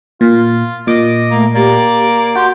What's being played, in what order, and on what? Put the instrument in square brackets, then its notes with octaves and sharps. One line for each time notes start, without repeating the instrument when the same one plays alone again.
[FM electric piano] A#2 [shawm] F4
[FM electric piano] A#2 D6 [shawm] D#5
[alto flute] A3 [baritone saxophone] A#3
[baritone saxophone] A#3 [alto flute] G4 [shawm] D5
[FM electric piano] F#4 [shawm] G4 [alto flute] C6